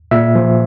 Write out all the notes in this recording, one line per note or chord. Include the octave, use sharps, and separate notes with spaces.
A#2 E5
F3